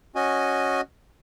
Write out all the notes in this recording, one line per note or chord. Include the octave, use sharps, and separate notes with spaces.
C#4 F#4 D#5 G#5